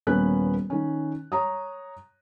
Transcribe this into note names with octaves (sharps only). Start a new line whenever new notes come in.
D#1 A#3 B3 C#4 B4 F#6
D#3 C#4
C#5 A#5 D#6